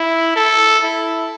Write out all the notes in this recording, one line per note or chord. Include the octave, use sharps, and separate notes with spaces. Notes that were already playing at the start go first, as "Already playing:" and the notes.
Already playing: E4
A4
E4